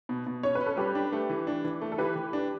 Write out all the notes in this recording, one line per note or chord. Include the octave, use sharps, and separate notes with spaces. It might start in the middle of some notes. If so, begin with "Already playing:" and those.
B2
B2
C#4 C#5
B4
C#4
A4
G3 G4 B4
D4
A3
E3
D4
E3
A3
A4
E3 G4 B4
E3
D4